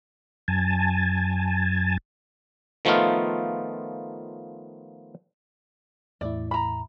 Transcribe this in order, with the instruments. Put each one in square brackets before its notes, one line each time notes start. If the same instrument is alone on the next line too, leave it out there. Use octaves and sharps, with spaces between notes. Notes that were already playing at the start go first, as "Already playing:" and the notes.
[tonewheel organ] F#2 G#5 A5
[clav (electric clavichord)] D#3 F3 A3 B3 D#4 F4
[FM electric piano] E2 A2 E4 [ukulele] D5
[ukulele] A#5 B5